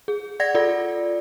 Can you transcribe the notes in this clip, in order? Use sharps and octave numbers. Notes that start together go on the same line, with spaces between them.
G#4
D5 F#5 G#6 A#6
F4 A4 D5